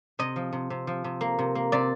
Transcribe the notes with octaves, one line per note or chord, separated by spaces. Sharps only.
C3 D#5
F3
C3
C3
F3
C3
A#3
C3
A#3
C3 D5